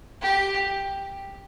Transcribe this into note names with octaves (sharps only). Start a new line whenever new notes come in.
G4